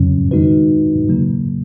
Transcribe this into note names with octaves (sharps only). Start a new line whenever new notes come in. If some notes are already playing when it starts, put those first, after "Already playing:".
Already playing: F2 C#3 F#3 C#4
D#3 G#3 D#4 F#4 B4
C#3 F#3 A#3